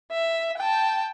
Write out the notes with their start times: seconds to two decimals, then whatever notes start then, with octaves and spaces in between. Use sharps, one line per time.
0.11 E5
0.58 G5 A5